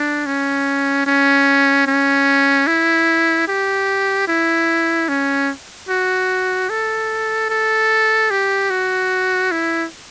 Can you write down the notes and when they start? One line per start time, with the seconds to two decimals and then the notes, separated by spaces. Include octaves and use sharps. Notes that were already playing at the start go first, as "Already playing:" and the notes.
Already playing: D4
0.26 C#4
1.07 C#4
1.87 C#4
2.67 E4
3.48 G4
4.28 E4
5.09 C#4
5.89 F#4
6.70 A4
7.50 A4
8.30 G4
8.70 F#4
9.51 E4